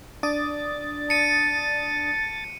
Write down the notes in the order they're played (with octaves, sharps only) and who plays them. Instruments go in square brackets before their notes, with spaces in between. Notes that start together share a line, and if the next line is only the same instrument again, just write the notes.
[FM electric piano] D4 D5 D#6 [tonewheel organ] A6
[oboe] A5 [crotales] C#7 D#7